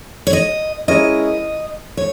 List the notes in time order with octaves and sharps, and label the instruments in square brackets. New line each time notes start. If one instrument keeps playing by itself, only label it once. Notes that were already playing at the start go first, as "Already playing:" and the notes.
[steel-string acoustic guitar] C#5
D#5
[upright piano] G#3 C#4 E4 A#4 C#5 [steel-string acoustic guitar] D#5
[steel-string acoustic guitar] C#5